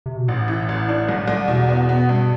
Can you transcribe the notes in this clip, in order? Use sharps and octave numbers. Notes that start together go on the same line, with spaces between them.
C3
B2
A1 A2
E3
A1
D4
C2
C2
E2 B2
B3
B3
G2